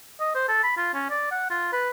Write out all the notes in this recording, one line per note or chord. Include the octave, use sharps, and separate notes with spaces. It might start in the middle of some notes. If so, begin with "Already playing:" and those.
D#5
C5
A4
B5
F4
C#4
D5
F#5
F4
B4